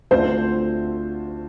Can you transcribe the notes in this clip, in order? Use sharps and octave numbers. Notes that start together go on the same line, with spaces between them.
D2 D3 A3 C4 F4 C5